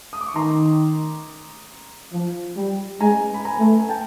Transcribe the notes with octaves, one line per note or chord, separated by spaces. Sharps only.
D#6
D6
C#6
D#3 A#5 C6
F3
G3
G#3 G#5 A#5
B5
G#5 A#5
A3
G#5
G5 A5